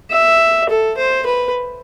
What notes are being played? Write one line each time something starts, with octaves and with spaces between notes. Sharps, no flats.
E5
A4
C5
B4